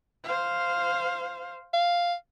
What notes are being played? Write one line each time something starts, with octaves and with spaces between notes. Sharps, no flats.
C5 F5
F5